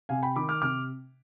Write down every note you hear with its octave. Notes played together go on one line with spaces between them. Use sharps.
C3 F5 G#5
G5 B5
D#3 B5 D6
D6 F6
C3 D6 F6